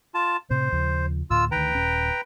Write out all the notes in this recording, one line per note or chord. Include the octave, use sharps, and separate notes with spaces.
F4 A5
A2 C3 C5
D#2 C#3 F3
D2 A2 F4 E6
D2 D#3 B4 G5 A#5
D#1 C#4